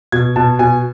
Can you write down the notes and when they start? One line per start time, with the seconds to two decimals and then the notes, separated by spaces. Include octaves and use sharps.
0.12 B2 G#6
0.36 B2 A5
0.59 B2 G#5